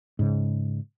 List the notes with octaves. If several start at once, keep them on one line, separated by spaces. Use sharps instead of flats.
G#2 C#3